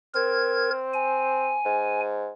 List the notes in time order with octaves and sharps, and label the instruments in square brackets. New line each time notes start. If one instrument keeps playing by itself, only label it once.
[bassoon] C4 [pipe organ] A#4 G#6
[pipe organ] G#5
[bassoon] G#2